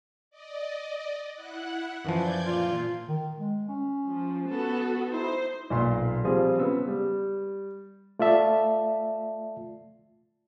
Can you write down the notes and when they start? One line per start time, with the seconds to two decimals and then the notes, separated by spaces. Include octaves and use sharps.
0.30 D5 D#5
1.35 E4 F#5 F#6
2.05 F#2 E3 F3 D5 G6 G#6
2.44 A#2 F4
3.09 D#3
3.39 G#3
3.69 C#4
4.09 F3
4.51 B3 F#4 A4
5.13 D#4 E4 C5
5.70 B1 A#2 C6
6.24 F3 G3 C4 F4 G#4
6.58 C#3 B3 E6
6.88 G3
8.19 A3 F4 D5 E5 A5